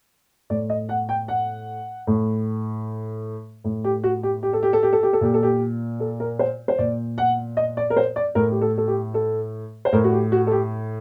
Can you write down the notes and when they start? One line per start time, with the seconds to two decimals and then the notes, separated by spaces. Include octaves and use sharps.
0.50 A2 D5
0.70 D#5
0.89 F#5
1.09 G5
1.28 F#5
2.07 A2
3.64 A2
3.84 G4
4.04 F#4
4.23 G4
4.43 G4
4.53 A4
4.63 G4
4.73 A4
4.83 G4
4.93 A4
5.03 G4
5.13 A4
5.21 A#2 G4
5.34 A4
5.43 G4
6.00 A4
6.20 A#4
6.39 C5
6.68 C5
6.79 A#2 D5
7.18 F#5
7.57 D#5
7.77 D5
7.90 A#4
7.97 C5
8.16 D5
8.35 A2 A#4
8.51 G4
8.61 A4
8.78 A4
8.88 G4
9.14 A4
9.85 C5
9.93 A2 A#4
10.04 F#4
10.12 G4
10.32 F#4
10.47 A4
10.51 G4